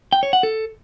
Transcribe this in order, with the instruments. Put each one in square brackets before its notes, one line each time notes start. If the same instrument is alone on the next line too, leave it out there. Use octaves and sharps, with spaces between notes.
[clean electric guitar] G5
C#5
F#5
A4